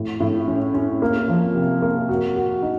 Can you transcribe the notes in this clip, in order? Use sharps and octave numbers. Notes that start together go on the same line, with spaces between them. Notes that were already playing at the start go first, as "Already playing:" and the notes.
Already playing: A2
A2
C#4
C#4
A#3
F3
C3
A#3
F#4
F#4
D#4